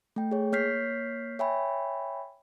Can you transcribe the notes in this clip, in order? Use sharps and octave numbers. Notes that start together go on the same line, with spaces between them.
A3 G5
G#4 C#5
A#3 C#5 F6 G6 B6 C7
C#5 E5 G5 G#5 B5